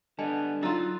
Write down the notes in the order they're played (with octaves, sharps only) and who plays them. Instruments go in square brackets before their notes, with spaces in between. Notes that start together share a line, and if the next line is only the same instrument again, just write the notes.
[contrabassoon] D3 [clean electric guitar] G3 B3 [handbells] D#5 G#5 A5
[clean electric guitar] F#3 [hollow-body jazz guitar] D#4 F4 [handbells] A#5 E6 A6